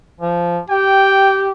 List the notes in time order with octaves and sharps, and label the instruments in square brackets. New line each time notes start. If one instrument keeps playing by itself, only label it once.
[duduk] F3
[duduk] G4 [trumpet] G5